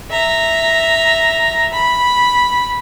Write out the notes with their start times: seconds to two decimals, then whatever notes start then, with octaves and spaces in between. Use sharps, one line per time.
0.11 E5 A#5
1.73 B5